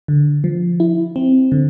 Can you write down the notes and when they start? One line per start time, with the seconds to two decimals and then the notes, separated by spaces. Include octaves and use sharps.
0.08 D3
0.44 F3
0.80 E4
1.16 C4
1.52 D3